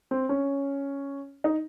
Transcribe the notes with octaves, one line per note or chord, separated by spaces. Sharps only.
C4
C#4
D#4